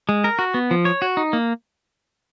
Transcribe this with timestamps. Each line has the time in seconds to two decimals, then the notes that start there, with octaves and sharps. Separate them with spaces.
0.09 G#3
0.24 A#4
0.39 F#4
0.54 B3
0.71 F3
0.85 C#5
1.02 F#4
1.17 D#4
1.33 A#3